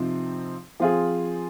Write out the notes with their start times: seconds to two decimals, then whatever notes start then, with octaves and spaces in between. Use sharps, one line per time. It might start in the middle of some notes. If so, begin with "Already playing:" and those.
Already playing: C3 F3 C4 D#4
0.80 F3 C4 F4 G#4